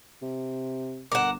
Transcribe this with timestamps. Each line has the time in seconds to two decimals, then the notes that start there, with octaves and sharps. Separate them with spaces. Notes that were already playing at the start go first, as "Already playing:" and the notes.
0.22 C3
1.12 G1 A#4 F#5 D6 E7